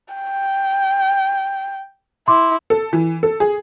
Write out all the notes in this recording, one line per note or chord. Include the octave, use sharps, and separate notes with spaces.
G5
E4 C6 D6
A4
E3
A4
G#4